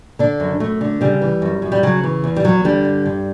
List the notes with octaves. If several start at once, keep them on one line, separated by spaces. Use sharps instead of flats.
D3 D4
F#2
F#2 A3
D3
C#3 G3
E3
F#2
F#2
G3
C#3 F#3
E3
E2
G3
E2 F#3
D3 G3
G2
G2